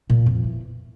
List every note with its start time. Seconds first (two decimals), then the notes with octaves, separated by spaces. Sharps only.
0.10 A#2
0.26 F2
0.44 E3